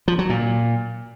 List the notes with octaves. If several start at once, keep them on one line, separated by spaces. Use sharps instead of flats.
F3
F#3
A#2